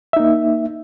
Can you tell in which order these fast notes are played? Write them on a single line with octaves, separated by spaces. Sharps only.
E5 D#4 A#3